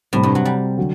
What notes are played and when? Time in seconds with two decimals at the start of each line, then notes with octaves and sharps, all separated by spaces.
0.13 A2 C3 G3 C4
0.23 G2
0.35 F#3
0.45 G3
0.77 D3 F#3